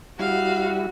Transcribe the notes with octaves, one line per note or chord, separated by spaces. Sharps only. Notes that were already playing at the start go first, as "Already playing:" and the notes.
G3 E4 F#4 F5